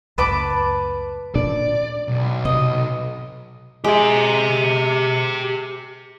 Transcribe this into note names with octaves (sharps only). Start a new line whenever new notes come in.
C#2 F#2 A2 B4 A5 D6
A#2 D4 D5
B1
C3 D#5
G#3 G4 E5